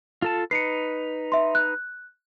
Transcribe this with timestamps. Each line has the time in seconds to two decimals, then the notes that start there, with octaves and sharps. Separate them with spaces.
0.22 F4 A4 A5
0.51 D#4 B4 C7 C#7
1.32 E5 C6
1.55 F#6